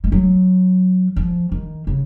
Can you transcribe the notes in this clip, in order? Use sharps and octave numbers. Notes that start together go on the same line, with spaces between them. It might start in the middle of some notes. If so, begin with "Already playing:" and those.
G#3
F#3
F3
D#3
C#3